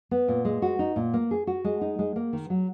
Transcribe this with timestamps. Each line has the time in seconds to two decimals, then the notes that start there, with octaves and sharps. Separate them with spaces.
0.11 B3
0.28 A#2
0.45 G#3
0.62 F#4
0.79 D#4
0.96 A#2
1.14 A#3
1.31 G#4
1.47 F#4
1.64 G#3
1.81 D#4
1.99 G#3
2.16 A#3
2.33 D#3
2.50 F#3